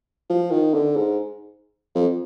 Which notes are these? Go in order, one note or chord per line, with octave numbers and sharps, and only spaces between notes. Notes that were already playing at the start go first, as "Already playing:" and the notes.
F3
D#3
D3
G#2
F2